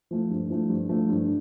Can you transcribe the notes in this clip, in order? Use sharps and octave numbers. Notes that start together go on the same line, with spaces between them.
F3 A3
G2
F3 A3
G2
F3 A3
G2